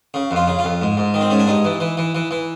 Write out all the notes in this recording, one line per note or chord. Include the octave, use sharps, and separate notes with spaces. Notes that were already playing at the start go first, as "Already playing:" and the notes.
C#3
F2
F4
C#3
F4
F2
G#2
G#2
D#3
C4
G#2 C#4
D4
G2 D#4
E3
E3
E3
E3
E3